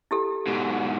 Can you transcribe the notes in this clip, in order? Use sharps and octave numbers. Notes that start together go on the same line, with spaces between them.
E4 G4 A4
G#2 B2